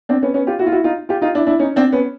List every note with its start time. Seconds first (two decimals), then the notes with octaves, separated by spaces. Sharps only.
0.09 C4 D4
0.23 B3 C#4
0.34 B3 C#4
0.47 F4 G4
0.59 E4 F#4
0.66 F4
0.72 E4 F#4
0.84 D#4 F4
1.09 F4 G4
1.21 D#4 F4
1.35 D4 E4
1.47 D4 E4
1.59 C#4 D#4
1.76 C4 D4
1.92 B3 C#4